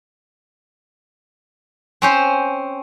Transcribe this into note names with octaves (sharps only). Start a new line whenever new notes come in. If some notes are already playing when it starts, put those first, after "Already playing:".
C4 C#4 C5